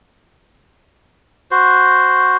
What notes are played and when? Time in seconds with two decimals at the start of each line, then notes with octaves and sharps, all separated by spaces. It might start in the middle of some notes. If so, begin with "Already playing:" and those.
1.51 F#4 C5